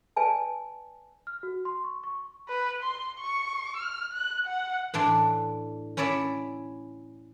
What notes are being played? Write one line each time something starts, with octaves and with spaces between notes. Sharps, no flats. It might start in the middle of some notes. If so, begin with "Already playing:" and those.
B4 D5 G#5 A5
F6
F#4
C6
C#6
C#6
B4
C6
C#6
F6
F#6
F#5
A2 E3 D4 D5 C6
C#4 E4 C#5 D5 E5